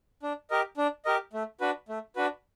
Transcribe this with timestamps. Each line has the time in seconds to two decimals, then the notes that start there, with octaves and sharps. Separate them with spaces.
0.23 D4
0.50 G4 A#4 D#5
0.77 D4
1.05 G4 A#4 D#5
1.33 A3
1.61 D4 F#4 B4
1.89 A3
2.16 D4 F#4 B4